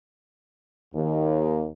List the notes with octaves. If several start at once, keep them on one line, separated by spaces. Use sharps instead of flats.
D#2